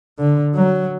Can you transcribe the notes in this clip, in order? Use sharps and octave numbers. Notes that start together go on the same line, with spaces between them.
D3
F#3